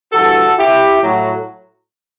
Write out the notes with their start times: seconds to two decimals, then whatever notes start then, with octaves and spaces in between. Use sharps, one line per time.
0.13 G2 E3 F#4 A4
0.58 E4 G4
1.02 A2 F#3